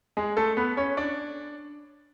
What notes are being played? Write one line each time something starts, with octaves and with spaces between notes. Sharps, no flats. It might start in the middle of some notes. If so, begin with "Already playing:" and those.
G#3 G#4
A3 A4
B3 B4
C#4 C#5
D4 D5